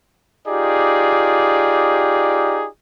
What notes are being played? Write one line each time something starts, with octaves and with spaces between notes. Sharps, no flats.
D#4 F4 G4 G#4 D5